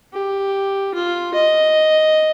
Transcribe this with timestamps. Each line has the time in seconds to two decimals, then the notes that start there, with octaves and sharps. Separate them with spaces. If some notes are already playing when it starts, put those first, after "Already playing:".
0.13 G4
0.94 F4
1.34 D#5